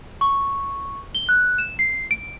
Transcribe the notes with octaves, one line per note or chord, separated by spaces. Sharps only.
C#6
G7
F#6
E7
C7
D7